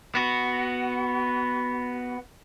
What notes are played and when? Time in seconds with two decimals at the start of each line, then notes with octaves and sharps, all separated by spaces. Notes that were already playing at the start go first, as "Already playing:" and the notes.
0.15 B3 F#4